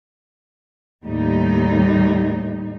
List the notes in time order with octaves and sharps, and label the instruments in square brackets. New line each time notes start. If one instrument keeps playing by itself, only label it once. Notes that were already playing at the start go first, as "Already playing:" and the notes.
[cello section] D#2 A2 G3 D#4